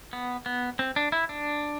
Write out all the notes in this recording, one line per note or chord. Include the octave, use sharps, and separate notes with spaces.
B3
B3
C4
D4
E4
D4